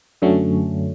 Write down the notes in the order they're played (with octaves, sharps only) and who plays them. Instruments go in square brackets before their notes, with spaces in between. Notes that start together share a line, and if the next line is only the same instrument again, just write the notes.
[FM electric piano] F#2 D3 F#3 A3 C#4